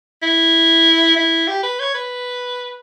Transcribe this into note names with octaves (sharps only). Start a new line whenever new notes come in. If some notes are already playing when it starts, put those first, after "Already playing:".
E4
E4
G4
B4
C#5
B4